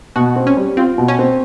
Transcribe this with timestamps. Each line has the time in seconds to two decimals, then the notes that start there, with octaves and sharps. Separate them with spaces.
0.16 B2 F#4
0.36 C4
0.47 C#4
0.57 G3
0.77 C4 F4
0.98 B2
1.08 C#4
1.19 C4